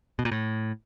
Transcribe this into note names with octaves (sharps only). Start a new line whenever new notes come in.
B2
A#2
A2